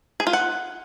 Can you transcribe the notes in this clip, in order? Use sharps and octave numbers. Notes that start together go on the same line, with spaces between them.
G#4
F4
F#5